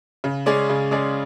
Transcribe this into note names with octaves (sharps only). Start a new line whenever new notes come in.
C#3
G#3 C#4 G#4 D5
C#3
G#3 C#4 G#4 D5